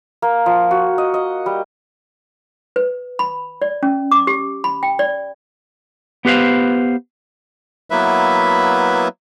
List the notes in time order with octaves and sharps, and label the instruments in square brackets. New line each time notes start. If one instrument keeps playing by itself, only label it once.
[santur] A#3
F3
F#4
D#5
D#5
G3
[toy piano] B4
B5
D5
C#4
D6
G4
B5
G5
D5
[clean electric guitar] B3 G4 B4 C5 F5
[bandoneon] F#3 A#3 B3 E4 B4 E5